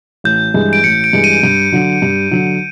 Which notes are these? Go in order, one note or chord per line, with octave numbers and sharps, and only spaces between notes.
A1 G6
G2 E3 G#3
D7
A1 C#7
D7
G2 E3 G#3
D#7
G2
D3 F#3
G2
D3 F#3